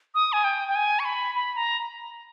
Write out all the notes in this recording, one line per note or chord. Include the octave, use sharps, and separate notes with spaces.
D#6
G#5
G5
G5
G#5
C#6
B5
B5
A#5